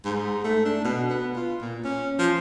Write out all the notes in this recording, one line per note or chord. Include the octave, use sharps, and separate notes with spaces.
G#2
A3
D4
B2
B3
F4
A#2
C#4
F3